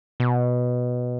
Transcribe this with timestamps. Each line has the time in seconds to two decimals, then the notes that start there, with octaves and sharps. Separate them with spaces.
0.20 B2